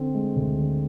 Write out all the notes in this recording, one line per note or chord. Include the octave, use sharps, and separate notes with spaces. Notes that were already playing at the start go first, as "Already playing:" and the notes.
Already playing: D3 C4
G#3
D2
D3